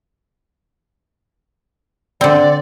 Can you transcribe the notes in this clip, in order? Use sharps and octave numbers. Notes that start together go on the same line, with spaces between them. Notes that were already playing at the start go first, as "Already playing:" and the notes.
D3 C4 D5